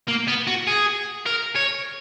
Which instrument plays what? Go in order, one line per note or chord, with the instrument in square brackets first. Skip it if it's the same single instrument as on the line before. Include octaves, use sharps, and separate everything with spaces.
[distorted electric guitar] A#3
B3
F#4
G#4
A#4
C#5